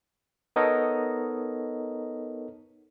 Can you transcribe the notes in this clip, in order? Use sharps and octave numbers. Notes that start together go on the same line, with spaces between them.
B3 D#4 A4 A#4 C#5 D#5